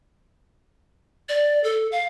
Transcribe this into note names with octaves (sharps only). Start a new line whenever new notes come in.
D5
A4
F5